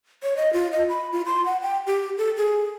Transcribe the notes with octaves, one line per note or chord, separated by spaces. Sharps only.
C#5
D#5
F4
D#5
B5
F4
C6
F#5
G5
G4
A4
G#4